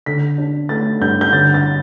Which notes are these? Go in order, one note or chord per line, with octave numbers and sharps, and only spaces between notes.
D3 B6
D4
A3 A6
G2 G6
G6
D3 A6
A6